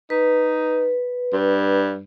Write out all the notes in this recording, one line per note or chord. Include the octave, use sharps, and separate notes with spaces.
D#4 B4
G2